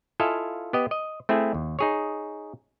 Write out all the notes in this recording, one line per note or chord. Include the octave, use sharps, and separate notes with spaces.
E4 F4 A4 D#5 F5 G#5
B3 G4 D#5
D#5
A3 C4 E4 G#4
D#2
D#4 G#4 C#5